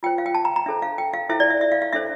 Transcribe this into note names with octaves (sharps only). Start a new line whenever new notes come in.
F4 C5 G5
F5
G5
A5
A#5
A#5
D4 A4 C5 E5
F5
G5
F5
E4 A4 C5 E5
D5
E5
E5
F5
F5
D4 A4 C5 E5